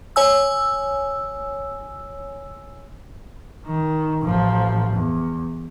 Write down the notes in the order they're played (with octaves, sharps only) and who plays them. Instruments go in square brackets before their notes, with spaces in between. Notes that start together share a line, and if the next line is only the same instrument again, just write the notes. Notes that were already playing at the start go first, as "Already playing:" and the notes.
[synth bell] C#5 G#5 E6
[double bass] D#3
A1 F3
E2